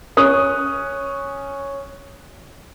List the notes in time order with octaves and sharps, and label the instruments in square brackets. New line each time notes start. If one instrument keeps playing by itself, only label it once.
[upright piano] C#4 D#6 F#6